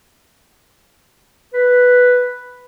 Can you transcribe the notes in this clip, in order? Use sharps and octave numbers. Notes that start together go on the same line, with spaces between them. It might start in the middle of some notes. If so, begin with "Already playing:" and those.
B4